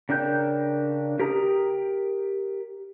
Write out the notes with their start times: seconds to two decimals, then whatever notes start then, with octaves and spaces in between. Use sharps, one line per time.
0.09 C#3 D4 A#4 G5 G6
1.20 G4 A#4 A#5 D#6